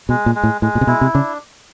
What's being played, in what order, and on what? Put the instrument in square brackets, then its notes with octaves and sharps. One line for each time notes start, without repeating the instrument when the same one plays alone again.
[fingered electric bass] B2 [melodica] G#3
[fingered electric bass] A#2
[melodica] G#3
[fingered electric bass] A2
[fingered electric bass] A2 [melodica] G#3
[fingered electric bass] A#2
C3
[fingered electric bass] B2 [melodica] E4
[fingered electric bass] C3
[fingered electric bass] C#3 [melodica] D4